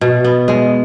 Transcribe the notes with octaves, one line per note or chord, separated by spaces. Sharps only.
B2
B3
G#3